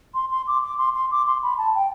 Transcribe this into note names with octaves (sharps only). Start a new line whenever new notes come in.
C6
C6
D6
D6
C6
C6
D6
C6
B5
A5
G5